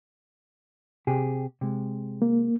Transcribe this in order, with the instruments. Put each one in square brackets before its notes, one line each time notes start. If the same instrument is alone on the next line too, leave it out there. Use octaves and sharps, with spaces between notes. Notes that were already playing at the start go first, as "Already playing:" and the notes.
[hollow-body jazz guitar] C3 G4 G#4
C3 G#3
[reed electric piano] A#3